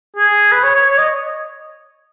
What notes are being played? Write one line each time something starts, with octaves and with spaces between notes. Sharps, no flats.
G#4
B4
C#5
C#5
C#5
D#5